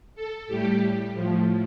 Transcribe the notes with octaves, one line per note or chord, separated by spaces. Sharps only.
A4
A2 G3 G4
A2 F3